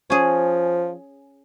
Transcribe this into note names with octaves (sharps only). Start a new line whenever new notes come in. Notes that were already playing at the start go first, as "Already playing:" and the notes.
F3 C#4 G#4